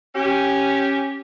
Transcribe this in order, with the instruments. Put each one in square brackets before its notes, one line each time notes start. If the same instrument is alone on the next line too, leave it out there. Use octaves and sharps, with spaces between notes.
[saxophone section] C#4 G4